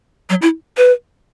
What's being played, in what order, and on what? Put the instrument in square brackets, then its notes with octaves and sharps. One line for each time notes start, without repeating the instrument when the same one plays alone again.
[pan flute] F#3
E4
B4